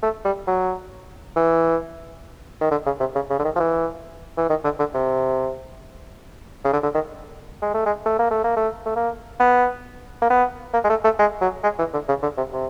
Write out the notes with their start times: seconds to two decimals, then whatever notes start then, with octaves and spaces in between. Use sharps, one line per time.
0.02 A3
0.25 G3
0.47 F#3
1.36 E3
2.61 D#3
2.71 D3
2.86 C#3
3.00 C3
3.15 C#3
3.30 C#3
3.39 D3
3.44 D#3
3.56 F3
3.60 E3
4.37 E3
4.49 D#3
4.64 D3
4.79 D3
4.94 C3
6.64 C#3
6.73 D3
6.83 D3
6.94 D#3
7.62 G#3
7.74 A3
7.85 G#3
8.06 A3
8.19 A#3
8.31 A3
8.44 A#3
8.57 A3
8.86 A3
8.96 A#3
9.40 B3
10.22 A#3
10.30 B3
10.74 A#3
10.84 G#3
10.90 A3
11.04 A3
11.19 G#3
11.41 F#3
11.63 G#3
11.79 E3
11.93 D3
12.08 C#3
12.22 D3
12.37 C3
12.53 C3